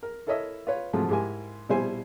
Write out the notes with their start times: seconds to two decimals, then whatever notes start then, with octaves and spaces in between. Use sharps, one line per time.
0.03 A#4
0.27 E4 A4 A#4 C#5 D#5 E5
0.67 F4 B4 C#5
0.93 G#2 C3 F3 F#3 G#3 A3
1.09 G#2 E4 G4 A#4 G#5
1.69 A#1 B2 G3 E4 C5 G#5